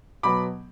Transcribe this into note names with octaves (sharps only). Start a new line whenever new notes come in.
B2 F#3 B3 B5 D6